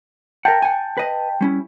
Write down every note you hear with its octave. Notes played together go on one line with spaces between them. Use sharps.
A#4 E5 F#5 G5 A5
F#5 G#5
B4 D#5
G3 C#4 E4